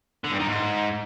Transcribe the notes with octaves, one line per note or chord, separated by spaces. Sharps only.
D3
G2
D#3
G#2